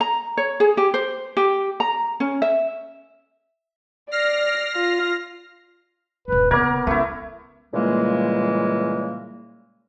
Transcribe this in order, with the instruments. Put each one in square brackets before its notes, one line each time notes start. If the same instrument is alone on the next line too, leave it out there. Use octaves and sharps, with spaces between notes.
[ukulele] A#5
C#5
G#4
G4
C5
G4
A#5
C#4
E5
[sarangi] D5 [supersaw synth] F6 A#6 C7
[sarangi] F4
[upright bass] D#1 G2 [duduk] B4
[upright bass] C#3 A#3 [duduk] B3 [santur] A#4 [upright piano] D6 G#6
[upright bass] C#2 [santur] A3 E4
[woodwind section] A#2 C#3 E3 G3 G#3 A#3